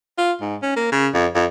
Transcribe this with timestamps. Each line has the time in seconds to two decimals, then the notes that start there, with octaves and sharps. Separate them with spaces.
0.18 F4
0.41 G#2
0.62 C#4
0.76 A#3
0.92 C#3
1.14 F2
1.35 F2